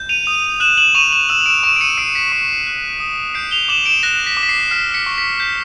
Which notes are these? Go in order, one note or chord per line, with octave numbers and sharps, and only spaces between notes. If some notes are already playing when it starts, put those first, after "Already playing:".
Already playing: G6
D#7 F7
D#6 D#7 F7
F#6 E7 F#7
E7 F#7
C#6 D#7 F7
E7 F#7
E6 E7 F#7
F7
D7 E7
C#6 D7 E7
D7
C#7 D#7
E6 C7 D7
B6 C#7
C#6 C7
C7
F#6
D#6
G6 C7 D7
F7 G7
D6 E7 F#7
D7 E7
F#6 A#6
B6
D6
B6
C7
F6 B6
B6 C#7
C#6
B6
G6 B6